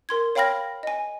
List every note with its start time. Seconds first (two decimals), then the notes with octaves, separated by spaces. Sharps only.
0.09 A#4 C6 G#6
0.35 C#5 F5 G5 B5 F6 A#6
0.83 D#5 G#5